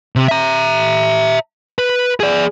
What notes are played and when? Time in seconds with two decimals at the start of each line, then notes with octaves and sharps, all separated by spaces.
0.16 C3
0.28 E5 A#5
1.78 B4
2.20 G#4 D5